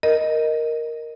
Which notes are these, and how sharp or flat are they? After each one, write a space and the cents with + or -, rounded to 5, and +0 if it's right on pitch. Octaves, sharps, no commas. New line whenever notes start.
A#4 +0 D#5 +0